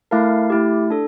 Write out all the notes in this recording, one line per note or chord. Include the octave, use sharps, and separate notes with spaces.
A3 E4 A#4 F5 A5
A3 E4 G4
D4 A4